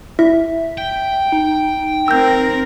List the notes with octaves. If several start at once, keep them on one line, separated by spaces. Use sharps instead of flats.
E4 E5
G5
D#4
C4 A#4 E6 G6